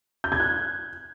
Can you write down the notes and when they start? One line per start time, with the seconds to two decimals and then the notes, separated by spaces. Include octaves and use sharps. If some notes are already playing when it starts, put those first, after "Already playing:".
0.24 G6
0.32 G#6
0.40 F#6